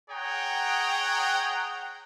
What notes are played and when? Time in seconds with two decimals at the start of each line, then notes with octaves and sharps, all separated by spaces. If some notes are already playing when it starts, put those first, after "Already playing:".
0.11 G#4 C#5 F#5 G5 A#5